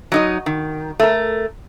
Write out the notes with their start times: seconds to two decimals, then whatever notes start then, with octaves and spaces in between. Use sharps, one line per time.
0.12 F#3 D#4 D#5
0.46 D#3
1.00 A3 A#4